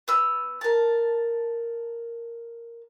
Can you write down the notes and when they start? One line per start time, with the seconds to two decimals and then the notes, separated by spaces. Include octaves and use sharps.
0.08 B3 E6
0.61 A#4 A5